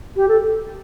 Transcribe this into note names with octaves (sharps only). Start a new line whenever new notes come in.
G4
A4